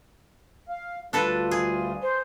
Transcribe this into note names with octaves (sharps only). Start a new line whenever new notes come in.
F5
D2 G3 D4 F4 A4 B4
G#4
C5